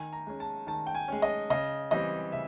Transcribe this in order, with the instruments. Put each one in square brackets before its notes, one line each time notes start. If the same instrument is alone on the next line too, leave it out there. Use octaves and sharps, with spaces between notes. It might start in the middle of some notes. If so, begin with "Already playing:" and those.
Already playing: [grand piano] D#3 G#5
A#5
G#3 C#4
A5
D#3 A5
G5
G#5
G#3 C#4
D#5
C#3 D#5
E3 G3 C4 D#5
C#3 E5